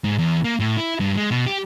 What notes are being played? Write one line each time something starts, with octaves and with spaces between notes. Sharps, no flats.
G#2
E2
A#3
A2
E4
G2
G#3
B2
G4